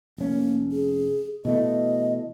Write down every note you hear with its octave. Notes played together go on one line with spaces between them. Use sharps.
F1 A#3 C#4
G#4
B2 E3 A3 D#5